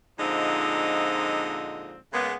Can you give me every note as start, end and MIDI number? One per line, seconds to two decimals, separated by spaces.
0.19 1.96 46
0.19 1.96 50
0.19 1.96 53
0.19 1.96 56
0.19 1.96 60
0.19 1.96 63
2.13 2.33 49
2.13 2.33 56
2.13 2.33 58
2.13 2.33 59